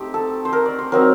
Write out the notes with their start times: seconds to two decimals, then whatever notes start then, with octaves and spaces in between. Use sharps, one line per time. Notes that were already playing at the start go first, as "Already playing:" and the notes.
Already playing: A3 C4 D#4 G4
0.14 A4
0.45 C5
0.53 A#4
0.66 D5
0.79 C5
0.92 F#3 C4 D#4 A#4